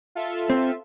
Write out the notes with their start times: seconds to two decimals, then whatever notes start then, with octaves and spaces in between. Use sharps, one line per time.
0.15 F4 A4 E5
0.50 C4